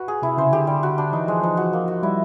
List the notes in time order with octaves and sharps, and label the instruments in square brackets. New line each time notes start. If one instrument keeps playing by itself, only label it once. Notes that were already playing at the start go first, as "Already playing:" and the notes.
Already playing: [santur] F#4 B4
G#4
[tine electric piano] C3 [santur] E4
[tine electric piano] C#3 [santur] C5
[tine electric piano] D3 [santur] G4
[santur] G3
F#4
D4
[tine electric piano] E3 [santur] D#4
[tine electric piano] F3 [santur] G#3
[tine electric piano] F3 [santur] D#4
[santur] F#4
A#3
F#4
[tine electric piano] G3 [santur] E4